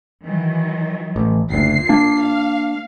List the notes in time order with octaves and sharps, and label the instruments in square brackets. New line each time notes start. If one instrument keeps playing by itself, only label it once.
[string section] D#3 E3 F#3
[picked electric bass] A1
[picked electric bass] F#1 D2 [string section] A#2 C7
[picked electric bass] A#3 D4
[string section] F5